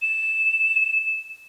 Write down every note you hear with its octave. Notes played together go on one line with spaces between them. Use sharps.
E7